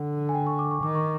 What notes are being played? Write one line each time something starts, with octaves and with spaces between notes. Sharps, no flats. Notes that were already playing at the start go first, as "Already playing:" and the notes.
Already playing: D3 F#5
G#5
G5
C#6
D6
C#6
D#3 D6
C#6